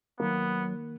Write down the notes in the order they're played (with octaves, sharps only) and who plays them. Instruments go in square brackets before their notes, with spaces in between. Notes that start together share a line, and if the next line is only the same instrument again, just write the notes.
[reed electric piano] D#3 A#3 [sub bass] F#3 [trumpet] B3